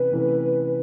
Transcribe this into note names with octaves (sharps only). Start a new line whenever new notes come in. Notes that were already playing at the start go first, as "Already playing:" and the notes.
Already playing: C3 E3 C#4 E4 B4
C3 E3 A3 C#4 E4